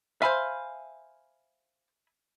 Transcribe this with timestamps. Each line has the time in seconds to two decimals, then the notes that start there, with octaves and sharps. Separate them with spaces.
0.22 C5 E5 F5 G#5 B5